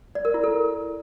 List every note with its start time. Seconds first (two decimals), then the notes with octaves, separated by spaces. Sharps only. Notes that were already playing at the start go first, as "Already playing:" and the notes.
0.15 D5
0.25 A#4
0.34 E4
0.44 A4